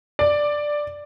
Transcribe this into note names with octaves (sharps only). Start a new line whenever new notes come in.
D5